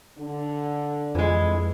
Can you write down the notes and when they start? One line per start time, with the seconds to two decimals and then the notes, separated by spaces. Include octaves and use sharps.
0.18 D3
1.15 F2 E3 G#3